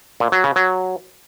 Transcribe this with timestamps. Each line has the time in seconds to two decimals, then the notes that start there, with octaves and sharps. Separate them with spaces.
0.20 A#2
0.32 F#3
0.44 C#3
0.56 F#3